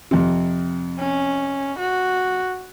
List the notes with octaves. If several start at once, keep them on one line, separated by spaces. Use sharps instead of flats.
F2 C3
C#4
F#4